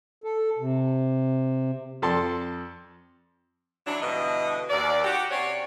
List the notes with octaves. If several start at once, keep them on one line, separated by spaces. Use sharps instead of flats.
A4
C3
F2 A4 D5 A5 C6
E3 F#3 C#4 D4
G2 B2 D3 E3 D#5
D#2 D5
F#4 G4
C3 C4 C#4 F#4 C#5 D5